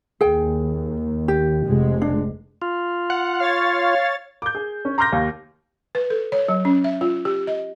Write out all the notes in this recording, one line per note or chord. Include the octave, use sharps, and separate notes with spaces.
D#2 G#4 G5
G4
F1 G#3
D4
F4
F#5
C#5 F5 A6
D6 G6
G#4
C#4
A#5 C6 D6 F6 G6 A#6
D#2
B4
A4
C#5
F#3
C#4
E5
F4
G4
D#5